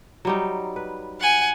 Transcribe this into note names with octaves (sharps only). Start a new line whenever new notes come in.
F#3 G3 D#4
B4
F#5 G#5